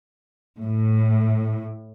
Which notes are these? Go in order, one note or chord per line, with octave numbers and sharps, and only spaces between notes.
A2